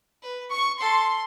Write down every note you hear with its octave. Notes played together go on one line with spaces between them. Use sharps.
B4
C#6
A4 C6